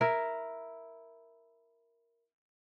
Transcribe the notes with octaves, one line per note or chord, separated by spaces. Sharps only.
E4 A#4 E5